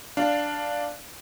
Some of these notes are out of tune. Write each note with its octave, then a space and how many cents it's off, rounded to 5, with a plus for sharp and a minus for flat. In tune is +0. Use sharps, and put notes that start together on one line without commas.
D4 +0 F5 +0